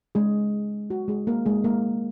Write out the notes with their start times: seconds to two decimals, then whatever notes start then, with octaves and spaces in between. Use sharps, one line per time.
0.15 G#3 G#4
0.90 F#4
1.08 G#3 G#4
1.27 A#3 A#4
1.46 G#3 G#4
1.64 A#3 A#4